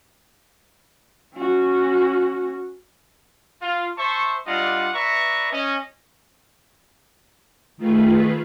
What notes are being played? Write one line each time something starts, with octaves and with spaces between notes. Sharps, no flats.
C#4 F#4
F4
C5 E5 A5 C#6
G3 D4 F4 D#5 F#5
B4 D5 E5 A#5 C#6
C#4 D#5
D#3 A3 F4 G#4 B4